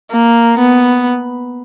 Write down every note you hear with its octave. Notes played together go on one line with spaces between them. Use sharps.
A#3
B3